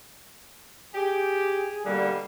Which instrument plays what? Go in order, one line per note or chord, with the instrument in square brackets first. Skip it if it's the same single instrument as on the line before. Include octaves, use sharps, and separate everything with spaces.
[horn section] G4 [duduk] G#4
[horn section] B2 D3 A#3 [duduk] G3